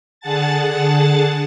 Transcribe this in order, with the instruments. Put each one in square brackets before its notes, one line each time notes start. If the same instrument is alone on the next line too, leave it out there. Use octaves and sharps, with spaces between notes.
[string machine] D3 G#4 F#5 A5 A6